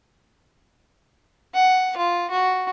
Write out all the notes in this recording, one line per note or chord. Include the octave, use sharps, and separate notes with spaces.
F#5
F4
F#4